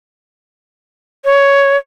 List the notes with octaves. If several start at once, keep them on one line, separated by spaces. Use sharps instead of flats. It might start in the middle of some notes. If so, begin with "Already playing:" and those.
C#5